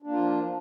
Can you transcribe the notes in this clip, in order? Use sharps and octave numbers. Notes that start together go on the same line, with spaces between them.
F3 A#3 D4 F4